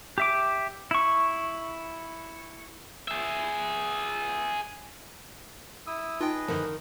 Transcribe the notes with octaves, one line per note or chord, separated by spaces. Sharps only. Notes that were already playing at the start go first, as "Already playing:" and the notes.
G4 E5 D6
E4 C#6
G#4 E5
E4 D#6 E6
D#4 F4 G#4 B4 D#5 G5
F#2 D3 D#3 F3